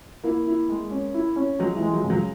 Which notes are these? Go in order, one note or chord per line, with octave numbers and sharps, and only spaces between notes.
A#3 E4
E4
G#3
C#4
E4
C#4
F#3 G#3
E3
G#3
F#3
C#3
F#3